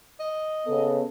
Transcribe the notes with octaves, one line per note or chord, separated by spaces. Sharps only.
D#5
C#3 B3 A4